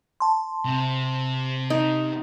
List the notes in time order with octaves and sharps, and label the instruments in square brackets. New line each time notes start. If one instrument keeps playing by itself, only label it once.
[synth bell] A5 C6
[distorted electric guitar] C3
[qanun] D#4